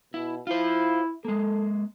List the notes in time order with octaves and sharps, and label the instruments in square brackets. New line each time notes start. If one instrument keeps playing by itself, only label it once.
[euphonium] B2 [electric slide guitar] E4
[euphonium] E4 [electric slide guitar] F4 C5
[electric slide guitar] G#3 A#3 [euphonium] A4